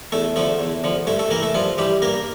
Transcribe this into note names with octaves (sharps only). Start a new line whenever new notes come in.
E2 A3 A4
D3 F3 A3 A4
E2
D3 F3
G2 A3 A4
A3 A4
E3 A#3 A#4
A3 A4
G2 F3 F4
E3 G3 G4
G2 A#3 A#4